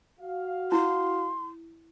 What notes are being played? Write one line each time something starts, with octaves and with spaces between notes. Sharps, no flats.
F#4 F5
E4 C6